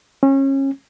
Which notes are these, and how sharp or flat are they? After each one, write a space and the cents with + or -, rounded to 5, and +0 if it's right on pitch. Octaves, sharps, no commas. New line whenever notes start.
C#4 -30